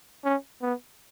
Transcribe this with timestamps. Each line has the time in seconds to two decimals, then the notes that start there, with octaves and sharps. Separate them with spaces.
0.24 C#4
0.62 B3